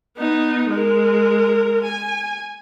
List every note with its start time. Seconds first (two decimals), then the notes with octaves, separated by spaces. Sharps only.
0.17 B3 D#4
0.69 G#3 A#4
1.84 G#5